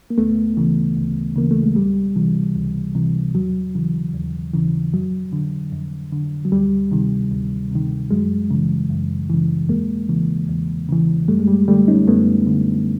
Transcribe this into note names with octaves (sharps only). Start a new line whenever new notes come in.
A#3
D2 A3 B3
C#3 E3
D2
C#3 E3 A#3
A3
G#3
C#2 G3
C3 E3
C#2
C3 E3
D#2 F#3
C#3 E3
D#2
C#3 E3
F2 F#3
D3
F2
D3
F#3
D2 G3
C3 D#3
D2
C3 D#3
F#2 F#3 G#3
C#3 E3
F#2
C#3 E3
E2 G#3 A#3
C#3 E3
E2
C#3 E3
F#2 G3 A3
G#3
G3
D3 G3 A3
C#4 D#4
F#2 A3 B3
D3